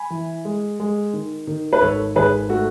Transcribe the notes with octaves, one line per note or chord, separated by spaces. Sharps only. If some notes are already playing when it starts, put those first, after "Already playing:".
Already playing: G#5 B5
E3
G#3
G#3
D#3
D#3
B4
G#1 A4 C#5
G#1 G#4 B4
A3 F#4 A4